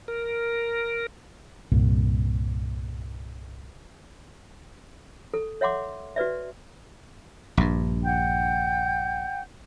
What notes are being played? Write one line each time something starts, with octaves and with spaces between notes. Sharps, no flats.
A#4
C2 G2 A#2
A4
C#5 E5 F#5 C6 D6
F#4 B4 D5 E5
A#1 G2
F#5 G5 G6